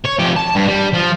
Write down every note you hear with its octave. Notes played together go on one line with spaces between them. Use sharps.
C#5
F2 G4
A5
G2
G3
F3